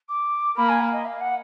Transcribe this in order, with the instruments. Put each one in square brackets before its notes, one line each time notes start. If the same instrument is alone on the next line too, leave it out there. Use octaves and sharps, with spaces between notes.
[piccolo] D6
[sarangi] A#3 [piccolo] B5
[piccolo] G#5
F5
D#5
F5
F#5